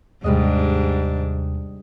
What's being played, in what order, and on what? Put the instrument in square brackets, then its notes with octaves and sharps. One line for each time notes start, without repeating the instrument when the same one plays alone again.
[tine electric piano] D#2 C3 [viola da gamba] G#2 D4 [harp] G3 G#3 D#5